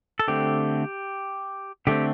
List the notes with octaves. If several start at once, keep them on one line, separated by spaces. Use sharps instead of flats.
A4
D3 A3 C4 G4
D3 A3 C4 G4